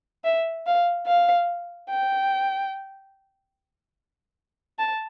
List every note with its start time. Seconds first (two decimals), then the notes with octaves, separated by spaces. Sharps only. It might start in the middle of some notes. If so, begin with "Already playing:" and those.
0.24 E5
0.66 F5
1.07 F5
1.90 G5
4.79 A5